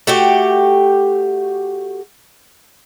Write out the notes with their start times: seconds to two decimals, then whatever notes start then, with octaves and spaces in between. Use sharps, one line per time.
0.07 A3 F#4 G4